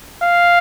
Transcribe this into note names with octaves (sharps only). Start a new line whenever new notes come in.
F5